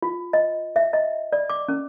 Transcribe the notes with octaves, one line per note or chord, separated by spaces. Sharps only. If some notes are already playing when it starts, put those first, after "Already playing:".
F4
D#5
E5
D#5
D5
D6
C#4